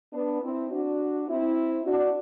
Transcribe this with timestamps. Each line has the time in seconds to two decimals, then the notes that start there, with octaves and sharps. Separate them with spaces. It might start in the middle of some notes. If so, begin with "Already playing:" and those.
0.13 B3 D4
0.42 C4 E4
0.71 D4 F#4
1.29 C4 E4
1.86 D4 F#4